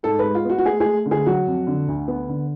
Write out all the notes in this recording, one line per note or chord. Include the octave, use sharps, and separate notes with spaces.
G#2 A4
G#3 B4
F4
B3 F#4
F#4
A3 G#4
A3 G#4
D3
G#4
F#3 F#4
F2
D3
D2
B3
D3